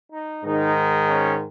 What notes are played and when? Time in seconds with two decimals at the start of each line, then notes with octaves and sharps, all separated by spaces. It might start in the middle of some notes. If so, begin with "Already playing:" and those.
0.13 D#4
0.44 G#2 D#3 G#3 D#4
1.07 C#4